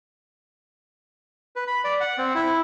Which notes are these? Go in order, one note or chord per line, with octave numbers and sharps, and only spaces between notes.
B4
B5
D5
F#5
C4
E4